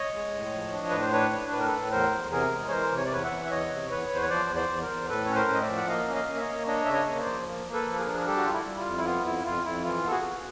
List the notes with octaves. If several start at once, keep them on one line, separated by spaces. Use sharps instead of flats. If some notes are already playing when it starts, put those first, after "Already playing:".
Already playing: C#5 D#5
G#3
A2
F3
D4
A2 B4
C5
D4 B4 C#5
D4
A2 B4
A#4
A4 B4
A2
E2 A#4 C5
E2
C3 G#4 A#4
G#3
C#5
E3 A#4 C5
C3
C#5
D5
E2 B4 C#5
E5 F#5
E3
E5
E2 C#5 D#5
C3
E2 B4 C#5
E2
C5
C#5
F3 C5 D5
E2
C5 D5
E2
A#4 C5
E2
A2 A4 B4
C#4 C#5
A#4 C5
A2
D#5
D5 E5
F3
F#5
A#3 D#5 F5
C#4
D#5 F5
A#3
E5
C#5 D#5
A#3
D4 C#5 D#5
C#3 E5
C#5 D#5
A#3
C5 D5
F3
A#3
A#3
A4 B4
F3
G#4 A#4
D4
A#4
G3 G4 A4
F#4
G3 F4
E4
G3
F4
F2
E4
B3 F4
F2 E4
F2 F4
F2 E4
E3 F4
B3 A4
F#4 G#4
B3